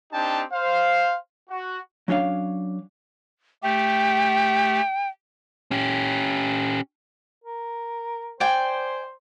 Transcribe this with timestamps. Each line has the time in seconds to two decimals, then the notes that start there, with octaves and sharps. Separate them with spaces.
0.13 C4 D4 D#4 G4 G5 A5
0.53 C5 F5
1.50 F#4
2.08 F#3 C#4 D4 C#5 F5
3.63 A3 G4 G5
5.71 C#4 G4
7.44 A#4
8.40 C5 D5 G5 G#5